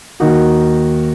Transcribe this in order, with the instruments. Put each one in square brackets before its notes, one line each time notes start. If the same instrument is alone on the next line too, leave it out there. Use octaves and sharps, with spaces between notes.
[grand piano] D#2 D#3 A#3 D#4 F#4